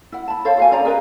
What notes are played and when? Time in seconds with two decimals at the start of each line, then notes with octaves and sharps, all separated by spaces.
0.12 E4 F#5
0.28 A5 B5
0.45 A4 C5 C#5 F5
0.57 F#4 F5 G#5
0.71 C#4 C5 D5 A#5
0.85 G#4 A#4 B4 D#5